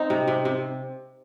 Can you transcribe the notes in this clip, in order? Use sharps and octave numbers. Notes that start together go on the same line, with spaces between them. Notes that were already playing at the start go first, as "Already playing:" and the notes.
Already playing: C4 D#4
C3
C3
C3